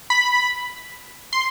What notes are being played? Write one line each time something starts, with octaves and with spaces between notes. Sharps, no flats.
B5
C6